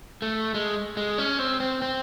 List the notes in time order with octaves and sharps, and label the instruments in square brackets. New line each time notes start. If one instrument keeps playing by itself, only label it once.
[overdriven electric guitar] A3
G#3
G#3
C#4
C4
C4
C4